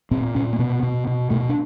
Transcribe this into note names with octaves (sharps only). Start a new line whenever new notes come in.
A#2 C4
A#2 C#4
A#3
B2 B3
B2
B2
B2 A3
D4